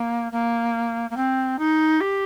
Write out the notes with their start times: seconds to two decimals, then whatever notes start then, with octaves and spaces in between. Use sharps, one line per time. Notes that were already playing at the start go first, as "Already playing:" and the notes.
Already playing: A#3
0.32 A#3
1.10 A#3
1.16 C4
1.58 D#4
2.00 G4